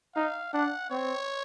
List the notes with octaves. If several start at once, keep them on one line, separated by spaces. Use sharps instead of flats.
D#4 F5
D4 F#5
C4 C#5